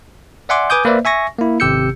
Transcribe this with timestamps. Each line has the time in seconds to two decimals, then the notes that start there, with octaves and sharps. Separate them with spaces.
0.49 D5 E5 F#5 G#5 C6 D6
0.70 B4 G#5 D6 D#6 G6
0.85 A#3 B4 C5 D5 E5
1.05 E5 G#5 C#6 A#6
1.38 A#3 E4
1.60 G#1 C3 G4 E6 G6 C#7